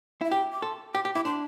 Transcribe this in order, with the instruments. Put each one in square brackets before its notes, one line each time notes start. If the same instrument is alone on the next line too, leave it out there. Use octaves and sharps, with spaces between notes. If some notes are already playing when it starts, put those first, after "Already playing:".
[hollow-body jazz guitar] E4 [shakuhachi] E5
[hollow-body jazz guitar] G4 [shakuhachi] G5
[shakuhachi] D6
[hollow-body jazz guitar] A4 [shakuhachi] C6
[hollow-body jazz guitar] G4 [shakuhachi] D6
[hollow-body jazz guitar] G4
[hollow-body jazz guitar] E4 [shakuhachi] D6
[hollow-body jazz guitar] D4 [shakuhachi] C6